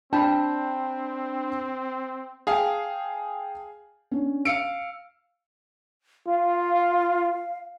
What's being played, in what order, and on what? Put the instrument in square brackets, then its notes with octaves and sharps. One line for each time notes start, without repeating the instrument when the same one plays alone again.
[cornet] C4 [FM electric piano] D4 [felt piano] G5 B5 [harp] A5
[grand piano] G#4 F5 [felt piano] G5 A5
[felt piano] C#4 D4
[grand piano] F5 C#7 D7 [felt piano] E6
[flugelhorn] F4 [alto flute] F5